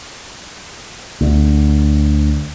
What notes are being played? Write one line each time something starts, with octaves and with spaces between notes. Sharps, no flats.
D2